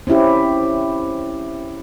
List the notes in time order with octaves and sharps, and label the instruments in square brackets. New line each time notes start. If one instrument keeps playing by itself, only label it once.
[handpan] C4 C#4 E4 G4